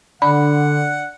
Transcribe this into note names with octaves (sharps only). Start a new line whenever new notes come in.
D3 D4 F#5 B5